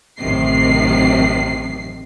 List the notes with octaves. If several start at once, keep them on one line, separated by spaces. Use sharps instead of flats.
A1 F#2 C3 D#3 C7